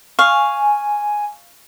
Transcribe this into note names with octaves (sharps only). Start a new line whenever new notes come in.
F5 G#5 C#6